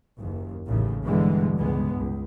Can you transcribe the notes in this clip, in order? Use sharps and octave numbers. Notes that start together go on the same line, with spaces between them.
F#1 D#2
A1 D#2 A2 C#3
G2 B2 D3 E3 G3 G#3
C#2 G2 G#3 B3
C#2